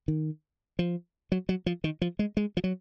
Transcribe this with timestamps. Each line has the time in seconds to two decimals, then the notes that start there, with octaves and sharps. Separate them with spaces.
0.08 D#3
0.79 F3
1.32 F#3
1.49 F#3
1.66 F3
1.84 D#3
2.02 F3
2.19 G#3
2.37 G#3
2.57 F3
2.64 F#3